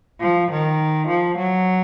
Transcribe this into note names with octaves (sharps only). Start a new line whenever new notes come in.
F3
D#3
F3
F#3